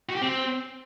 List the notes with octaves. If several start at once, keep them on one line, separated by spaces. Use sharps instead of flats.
F#4
G4
C4